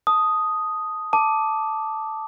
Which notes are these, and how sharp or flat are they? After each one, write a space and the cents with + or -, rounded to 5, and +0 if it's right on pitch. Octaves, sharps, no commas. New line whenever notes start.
A5 +0 D#6 +0
A5 +0 D6 +0